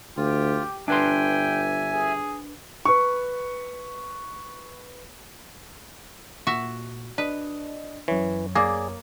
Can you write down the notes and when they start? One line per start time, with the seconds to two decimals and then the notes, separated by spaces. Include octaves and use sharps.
0.17 D2 F4 G4
0.88 G1 D4 B4 E5 G5 G#5 C6
1.93 G#4
2.85 B4 C#6
6.47 A#2 F#4 E5
7.18 D4 B4 D#5
8.08 F#2 E3 C#5
8.55 A#3 G#4 D5